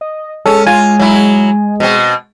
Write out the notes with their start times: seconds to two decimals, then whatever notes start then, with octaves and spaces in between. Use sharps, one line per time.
0.01 D#5
0.46 G#3 C#4 A4
0.67 F4 G#5
1.00 F#3 E4
1.80 B2 C4